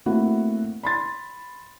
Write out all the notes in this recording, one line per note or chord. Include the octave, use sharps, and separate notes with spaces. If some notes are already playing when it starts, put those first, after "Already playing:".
A3 A#3 C4 E4 F#4
B5 C6 A6